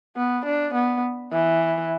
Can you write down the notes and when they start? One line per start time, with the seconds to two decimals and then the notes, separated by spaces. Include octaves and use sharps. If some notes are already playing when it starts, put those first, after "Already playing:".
0.16 B3
0.45 D4
0.74 B3
1.32 E3